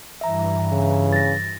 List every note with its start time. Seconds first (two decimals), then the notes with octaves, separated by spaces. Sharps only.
0.21 G2 E3 E5 A#5
0.72 C#3
1.13 A6 A#6